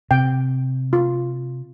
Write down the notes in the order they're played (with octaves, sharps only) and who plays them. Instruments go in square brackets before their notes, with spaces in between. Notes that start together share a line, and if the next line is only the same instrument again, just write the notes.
[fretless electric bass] C3 [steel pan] G5
[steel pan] F4